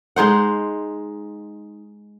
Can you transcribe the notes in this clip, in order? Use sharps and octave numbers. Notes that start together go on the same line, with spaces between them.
G#3 D#4 C5 F#5